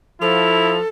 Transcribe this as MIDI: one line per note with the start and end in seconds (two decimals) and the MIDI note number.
0.21 0.78 53
0.21 0.76 64
0.21 0.88 69
0.21 0.77 101